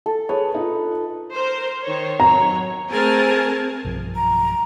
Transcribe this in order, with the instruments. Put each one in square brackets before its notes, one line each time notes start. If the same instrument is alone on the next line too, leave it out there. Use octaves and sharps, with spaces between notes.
[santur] A4
[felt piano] G#4 C#5 [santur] B4
[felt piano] D#4 F4
[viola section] A#4 C5
D#3 C5 C#5
[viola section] F#3 C#5 [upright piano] A#5
[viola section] A3 C4 G#4 A#4 G#5 A5
[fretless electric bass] B1 G2 F3
[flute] A#5